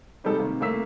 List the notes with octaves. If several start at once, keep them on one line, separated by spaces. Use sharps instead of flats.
C3 G3 G#3 D#4 A4
C3 D#3 A#3
C2 A3 A#3 E6 B6